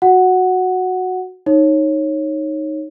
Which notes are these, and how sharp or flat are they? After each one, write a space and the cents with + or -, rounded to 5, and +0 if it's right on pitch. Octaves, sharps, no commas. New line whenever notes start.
F#4 -10 F#5 +0
D#4 +0 C#5 -20